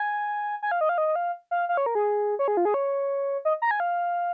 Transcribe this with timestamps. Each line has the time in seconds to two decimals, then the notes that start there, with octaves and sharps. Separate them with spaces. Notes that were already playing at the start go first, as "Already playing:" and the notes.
Already playing: G#5
0.63 G#5
0.71 F5
0.81 D#5
0.89 F5
0.98 D#5
1.16 F5
1.51 F5
1.69 F5
1.77 C#5
1.86 A#4
1.95 G#4
2.39 C#5
2.48 G#4
2.57 F4
2.65 G#4
2.74 C#5
3.45 D#5
3.62 A#5
3.71 G#5
3.80 F5